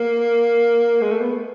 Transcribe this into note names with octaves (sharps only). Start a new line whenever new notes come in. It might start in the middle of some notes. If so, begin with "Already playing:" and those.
Already playing: A#3
G#3
A3
B3